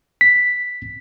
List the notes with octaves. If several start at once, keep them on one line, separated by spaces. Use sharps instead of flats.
B6